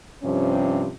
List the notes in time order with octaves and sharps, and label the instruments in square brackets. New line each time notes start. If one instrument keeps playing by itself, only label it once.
[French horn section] G2 C3 F3 C#4